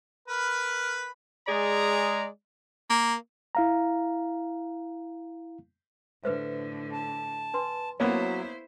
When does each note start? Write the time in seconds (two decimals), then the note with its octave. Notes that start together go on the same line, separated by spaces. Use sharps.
0.28 A#4 B4 B5
1.48 G#3 G#4 D5 A#5
2.90 A#3
3.55 E4 F5 A#5
6.24 A2 D3 B4 C5 E5
6.92 A5
7.54 D4 B4 C6
8.00 F#3 A#3 B3 C#4 E4 C5